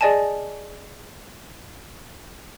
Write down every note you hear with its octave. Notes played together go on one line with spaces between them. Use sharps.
G#4 D5 D#5 G#5 A5